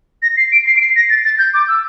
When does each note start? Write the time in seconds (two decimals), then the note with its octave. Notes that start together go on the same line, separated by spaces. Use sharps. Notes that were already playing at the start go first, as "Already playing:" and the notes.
0.22 A#6
0.37 C7
0.52 D7
0.67 C7
0.77 D7
0.81 C7
0.96 A#6
1.10 A6
1.25 A6
1.39 G6
1.54 D6
1.68 E6